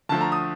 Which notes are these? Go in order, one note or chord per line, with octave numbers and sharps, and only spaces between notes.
D2 D3 F3 A3 A5
A#5
D#6